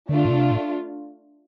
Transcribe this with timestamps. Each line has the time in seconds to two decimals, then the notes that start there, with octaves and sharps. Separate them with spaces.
0.09 D3 A3 D4 F4
0.25 A2
0.30 C3
0.51 A2